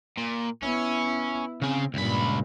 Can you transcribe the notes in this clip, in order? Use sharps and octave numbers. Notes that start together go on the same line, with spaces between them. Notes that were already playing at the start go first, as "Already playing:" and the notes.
A#2
B3 C#4 E4
C#3 C4 G#4
C#2 G2 A#2 B5